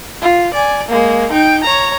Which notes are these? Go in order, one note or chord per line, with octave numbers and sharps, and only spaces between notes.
F4
D5 G#5
G#3 A#3
D#4 G5
C#5 A#5